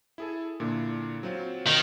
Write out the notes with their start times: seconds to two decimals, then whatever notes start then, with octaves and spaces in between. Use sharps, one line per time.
0.18 E4 G#4 A4
0.60 A#2 D3 E4
1.23 F#3 C4 F4
1.67 D#3